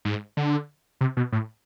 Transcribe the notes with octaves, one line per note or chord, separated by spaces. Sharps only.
G#2
D3
C3
B2
A2